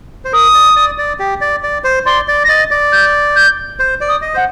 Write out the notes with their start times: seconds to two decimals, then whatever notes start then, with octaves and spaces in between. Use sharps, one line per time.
0.25 C5
0.32 A#4 D#6
0.54 D5
0.76 D5
0.98 D5
1.19 G4
1.41 D5
1.63 D5
1.84 C5
2.06 D5 C6
2.28 D5
2.44 A#6
2.49 D#5 A6
2.71 D5
2.92 G6
3.36 G6
3.79 C5
4.01 D5
4.09 D#6
4.22 D#5
4.34 C5 F#5